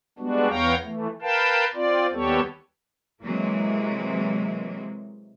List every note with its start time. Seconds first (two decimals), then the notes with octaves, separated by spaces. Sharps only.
0.19 G3 G#3 B3 D4 F#4
0.49 E2 B3 C#5 F5 G5 A#5
0.85 E3 A3
1.22 A#4 B4 F5 G5 A5
1.74 C4 F4 D5
2.13 D#2 G3 B3 G4 A4 C#5
3.22 C3 E3 F#3 G#3 A#3